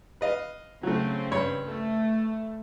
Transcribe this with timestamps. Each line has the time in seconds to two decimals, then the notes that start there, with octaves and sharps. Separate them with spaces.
0.21 B4 D#5 F5
0.83 C#3 F#3 A3 C4
1.32 G2 C#5
1.67 A3